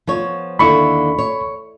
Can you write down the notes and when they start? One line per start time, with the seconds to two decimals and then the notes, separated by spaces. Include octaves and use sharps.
0.07 F3 B3 C#5
0.59 D#2 D3 E4 B5 C#6
1.18 C#5